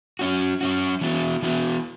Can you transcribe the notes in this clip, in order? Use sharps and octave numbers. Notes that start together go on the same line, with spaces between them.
F#3 C#4 F#4
F#3 C#4 F#4
E3 B3 F#4
E3 B3 F#4